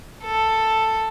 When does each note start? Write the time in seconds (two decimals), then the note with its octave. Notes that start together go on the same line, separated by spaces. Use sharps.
0.23 A4